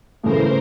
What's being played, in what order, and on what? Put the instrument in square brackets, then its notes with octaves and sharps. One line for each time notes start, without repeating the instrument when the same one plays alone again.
[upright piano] C#3 E3 A3 [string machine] A#4 C5